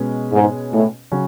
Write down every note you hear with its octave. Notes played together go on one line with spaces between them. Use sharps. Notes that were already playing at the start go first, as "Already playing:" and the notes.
Already playing: B2 G#3 C#4 G#4 B4
G#2
A2
C#3 F#3 C#4 F#4